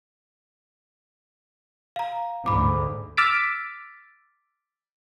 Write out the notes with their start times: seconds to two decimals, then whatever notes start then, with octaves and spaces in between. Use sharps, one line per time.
1.96 F5 A#5
2.46 D2 G#2 B5 D6
3.17 D6 E6 F6 A6 B6 D7